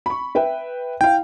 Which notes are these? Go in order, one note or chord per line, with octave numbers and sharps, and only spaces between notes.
B5 C#6
B4 E5 G5
E4 F5 G5